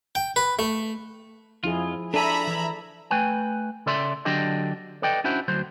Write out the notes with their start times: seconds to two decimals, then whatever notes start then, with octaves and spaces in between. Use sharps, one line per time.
0.15 G5
0.36 B4
0.59 A3
1.64 F2 F3 E4 F4 G#4
2.14 D4 A4 D5 E5 G#5 A#5 B5
2.47 E3 E4
3.11 A3 B4 G5 G#5
3.86 C#3 A4 D5 E5 C6
4.25 D3 F#3 D4 G4 A4 D#5
5.02 A4 B4 D5 D#5 G5
5.24 C#4 D4 E4 F#4 C5
5.48 D2 F#3 C5